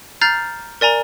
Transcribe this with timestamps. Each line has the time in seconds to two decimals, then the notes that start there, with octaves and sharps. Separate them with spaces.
0.21 A#5 F6 G6 A6 C7
0.81 A#4 D5 G#5 A#5